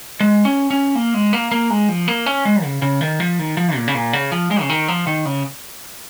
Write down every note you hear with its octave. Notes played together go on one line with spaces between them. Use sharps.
G#3
C#4
C#4
A#3
G#3
A#3
A#3
G#3
F3
A#3
C#4
G#3
C#3
C#3
D#3
F3
D#3
F3
A#2
C#3
A#2
C#3
F3
G#3
C#3
D#3
F3
D#3
C#3